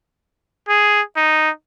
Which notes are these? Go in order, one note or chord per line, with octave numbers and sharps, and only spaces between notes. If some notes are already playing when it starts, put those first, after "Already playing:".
G#4
D#4